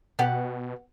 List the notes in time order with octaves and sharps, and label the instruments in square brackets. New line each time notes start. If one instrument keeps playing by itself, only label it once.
[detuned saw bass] B2 [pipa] B3 G4 F#5